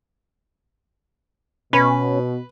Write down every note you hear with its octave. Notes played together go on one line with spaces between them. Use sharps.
B2 C#4 B4